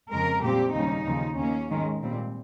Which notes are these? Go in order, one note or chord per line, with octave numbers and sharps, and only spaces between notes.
F2 C#3 G#3 A#4
A#2 G3 C4 G4
D#2 C#3 G3 C#4 D#4
D#2 C#3 F3
D#2 D#3 A#3 C#4
G#2 D#3 G#3 C#4
A#2 G3 C4